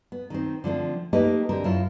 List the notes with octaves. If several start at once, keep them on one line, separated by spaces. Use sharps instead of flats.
B3
D#3 C4
D3 F3 A3 C4
A3 A#3 D#4 G4 B4 D#5
D3 C4 G4 A#4
F#2 E4 F4